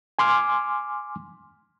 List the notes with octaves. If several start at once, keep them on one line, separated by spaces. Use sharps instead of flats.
G#5 C6 D6 F6